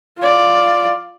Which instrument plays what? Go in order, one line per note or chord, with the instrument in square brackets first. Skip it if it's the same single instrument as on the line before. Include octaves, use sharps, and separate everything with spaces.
[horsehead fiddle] F4 D5